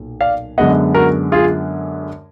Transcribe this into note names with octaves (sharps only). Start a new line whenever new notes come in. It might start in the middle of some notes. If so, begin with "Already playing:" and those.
Already playing: B1 A#2
D5 F5
F#2 D3 G#3 B3 D#5 F#5
F#4 A#4
F4 G#4